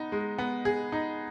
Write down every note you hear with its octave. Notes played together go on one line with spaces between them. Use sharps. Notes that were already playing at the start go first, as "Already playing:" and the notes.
Already playing: B3 D#4
G#3
B3
G#4
D#4